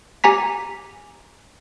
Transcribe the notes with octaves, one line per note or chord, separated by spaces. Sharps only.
G4 G#5 A#5 B6